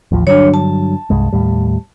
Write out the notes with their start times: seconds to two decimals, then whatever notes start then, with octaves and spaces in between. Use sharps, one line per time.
0.12 A1 D#2 F3
0.27 G2 D3 F#3 D4 C#5
0.54 A5
1.10 C2 G2 G#3
1.33 D#2 A2 G3